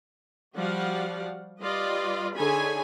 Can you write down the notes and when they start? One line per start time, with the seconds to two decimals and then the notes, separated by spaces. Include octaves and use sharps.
0.55 F3 G3 F#4 D5 F5 F#5
1.60 G3 F4 B4 D5 D#5
2.35 D3 D#4 G#4 C#5 G#5 B5